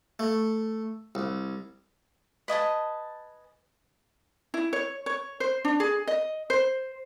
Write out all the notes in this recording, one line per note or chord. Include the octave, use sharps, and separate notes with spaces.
A3
C2
B4 D#5 G#5 A5
E4
C#5
C#5
C5
D4
G#4
D#5
C5